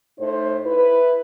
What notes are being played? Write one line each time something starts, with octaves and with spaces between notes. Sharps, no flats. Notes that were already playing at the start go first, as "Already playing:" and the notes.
A2 D#4 C5
E4 B4